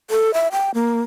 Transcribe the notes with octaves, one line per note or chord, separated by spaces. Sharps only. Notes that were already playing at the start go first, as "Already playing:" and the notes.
A4
E5
G5
A#3